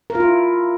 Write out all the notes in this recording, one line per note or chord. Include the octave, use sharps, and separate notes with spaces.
A#4
F4
E4